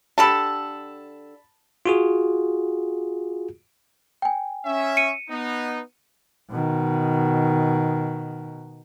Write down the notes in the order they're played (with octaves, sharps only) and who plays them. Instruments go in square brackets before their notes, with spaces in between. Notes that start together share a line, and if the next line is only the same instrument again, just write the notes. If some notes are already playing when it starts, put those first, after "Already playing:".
[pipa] D3 G4 A4 [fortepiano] A5 B5
[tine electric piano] F4 F#4 G#4
[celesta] G5 G#5
[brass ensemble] C#4 E5
[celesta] C#7 D#7
[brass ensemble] B3 D#4
[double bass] B2 D#3